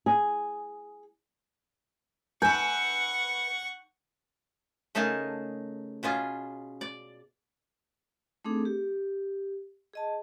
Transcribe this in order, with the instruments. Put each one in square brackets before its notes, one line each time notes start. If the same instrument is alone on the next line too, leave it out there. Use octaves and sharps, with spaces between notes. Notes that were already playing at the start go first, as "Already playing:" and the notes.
[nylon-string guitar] G#4
[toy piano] D#4 G#5 A#5 [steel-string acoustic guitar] B4 E5 [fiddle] F#5 C#6 [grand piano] G6
[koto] C#3 A3 D#4 G#4 A#4 A5
B2 C#4 F4 G#4
D5
[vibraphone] A3 C4 D4 D#4 G#4 A4
G4
G#4 D#5 A5